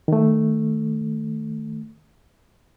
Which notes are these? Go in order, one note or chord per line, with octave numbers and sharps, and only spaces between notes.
D#3 A3